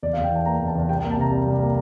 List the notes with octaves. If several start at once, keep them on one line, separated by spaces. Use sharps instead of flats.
E2 D5
F5
E2
G5
E3 A5
A#3 A#5
E2
A5
E2
C2 G5
G5
A#3
A5
C3 A#5
G3
C2
A#3